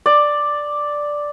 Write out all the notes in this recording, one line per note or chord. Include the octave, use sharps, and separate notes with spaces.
D5